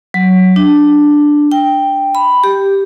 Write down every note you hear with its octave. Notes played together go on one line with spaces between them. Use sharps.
F#3
D4
G5
B5
G4